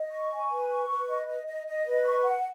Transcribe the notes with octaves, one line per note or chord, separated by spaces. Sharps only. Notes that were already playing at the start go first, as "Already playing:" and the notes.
Already playing: D#5
C#6
G#5
B4
C#6
B4
D#5
D#5
D#5
D#5
B4
C#6
F#5